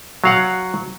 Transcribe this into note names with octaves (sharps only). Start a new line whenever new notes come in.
F#3 F5 F#5